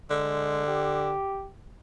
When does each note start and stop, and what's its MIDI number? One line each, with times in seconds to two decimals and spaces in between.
0.10 1.16 50
0.10 0.66 56
0.67 1.49 67